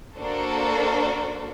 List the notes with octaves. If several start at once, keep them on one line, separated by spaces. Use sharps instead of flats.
A#3 D4 F#4 A4 C5